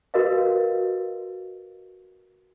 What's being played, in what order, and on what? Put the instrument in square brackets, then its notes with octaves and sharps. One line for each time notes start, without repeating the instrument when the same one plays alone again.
[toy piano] F#4 A#4 B4 D#5 F5